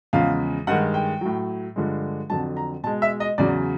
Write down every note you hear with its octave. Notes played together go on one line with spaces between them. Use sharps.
E2 C#3 F3 G#3 F5
G2 D#3 G#3 F#5
G5
A2 F#3
G2 D3 F3 G#3
F2 D3 F#3 A5
A#5
B2 G#3 A5
E5
D#5
E2 C#3 F#3 D5